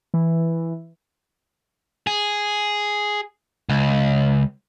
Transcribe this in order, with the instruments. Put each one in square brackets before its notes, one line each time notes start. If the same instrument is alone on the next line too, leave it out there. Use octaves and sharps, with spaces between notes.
[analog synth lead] E3
[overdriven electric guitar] G#4
C#2